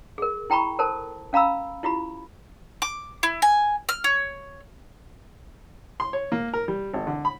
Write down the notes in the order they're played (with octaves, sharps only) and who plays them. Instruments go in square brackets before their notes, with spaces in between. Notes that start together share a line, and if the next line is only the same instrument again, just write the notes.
[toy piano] G#4 A#4
E4 G5 A#5 B5 C#6
A4 A#4 C5 A5
C#4 F5 A#5 B5 E6
E4 F4 G4 B5
[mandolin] D6
E4
G#5
F6
C#5
[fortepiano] C6
C#5
A#3
A#4
G3
G#1
D3
B5